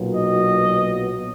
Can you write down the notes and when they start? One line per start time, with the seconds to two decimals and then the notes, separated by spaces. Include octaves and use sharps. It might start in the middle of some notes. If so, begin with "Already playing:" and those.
Already playing: B1 A#2 F#3 B3
0.13 D#5